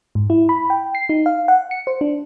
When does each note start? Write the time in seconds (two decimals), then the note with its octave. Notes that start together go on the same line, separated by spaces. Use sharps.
0.15 G#2
0.30 E4
0.49 B5
0.70 G5
0.95 C7
1.09 D#4
1.26 F5
1.48 F#5
1.71 C#7
1.87 C5
2.01 D4